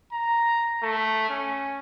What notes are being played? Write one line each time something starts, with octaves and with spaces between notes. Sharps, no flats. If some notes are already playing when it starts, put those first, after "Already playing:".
A#5
A3
C#4